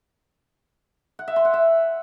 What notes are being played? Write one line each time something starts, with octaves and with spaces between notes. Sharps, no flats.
F#5
E5
C6
F#5
E5